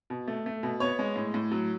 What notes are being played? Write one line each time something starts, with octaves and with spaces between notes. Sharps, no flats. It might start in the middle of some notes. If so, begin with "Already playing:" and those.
B2
A3
A3
B2
B3 C#5 C#6
G#3
A2
A2
F#3